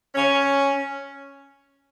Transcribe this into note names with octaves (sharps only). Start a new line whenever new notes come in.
C#4